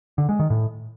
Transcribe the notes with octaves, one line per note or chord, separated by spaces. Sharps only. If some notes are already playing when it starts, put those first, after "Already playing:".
D3
G#3
D#3
A2